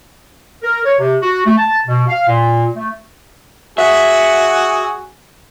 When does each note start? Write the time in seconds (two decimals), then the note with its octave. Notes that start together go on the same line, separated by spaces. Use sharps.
0.62 A#4
0.85 C#5
0.98 C3
1.21 F#4
1.46 A3
1.58 A5
1.87 B2
2.08 F5
2.27 A#2
2.76 A3
3.78 F#4 G#4 E5 F#5